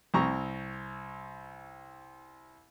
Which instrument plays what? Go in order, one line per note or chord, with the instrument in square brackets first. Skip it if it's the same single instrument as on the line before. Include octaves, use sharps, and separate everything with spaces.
[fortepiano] C2 C4 A#5 C#6